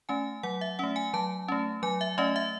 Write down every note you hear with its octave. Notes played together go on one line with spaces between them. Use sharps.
A3 C#4 G#5
F#3 F#5
E5
A3 C#4 F#5
G#5
F#3 A5
A3 C#4
F#3 G#5
E5
A3 C#4 D#5
E5